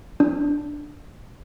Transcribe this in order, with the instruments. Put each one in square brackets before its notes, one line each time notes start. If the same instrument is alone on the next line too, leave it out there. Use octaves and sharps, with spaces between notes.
[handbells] D4